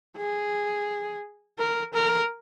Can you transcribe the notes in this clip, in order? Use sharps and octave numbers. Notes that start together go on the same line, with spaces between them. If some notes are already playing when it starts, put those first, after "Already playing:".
G#4
A#4
A#4